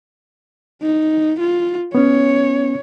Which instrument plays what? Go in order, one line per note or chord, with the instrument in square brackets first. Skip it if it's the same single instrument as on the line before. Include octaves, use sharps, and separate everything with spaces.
[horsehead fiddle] D#4
F4
[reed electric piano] B3 C#4 [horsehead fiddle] C#5